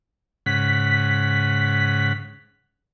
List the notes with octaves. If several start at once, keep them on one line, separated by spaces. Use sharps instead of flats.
G#2 C#3 F#5 B6